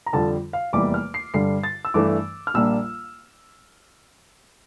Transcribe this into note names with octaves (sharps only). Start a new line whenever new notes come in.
A#5
F2 D3 G3 A5
F5
F1 E2 E3 G3 A#3 D6
F6
C7
G2 D3 G3 C7
A6
E6
G2 E3 A3 D4 D6
F6
A#1 A#2 G3 A#3 D4 E6